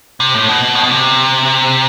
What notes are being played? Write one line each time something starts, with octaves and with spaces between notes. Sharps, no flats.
C3
A2
B2
A2
B2
C3